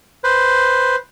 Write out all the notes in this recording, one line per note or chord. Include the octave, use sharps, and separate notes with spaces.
B4 C5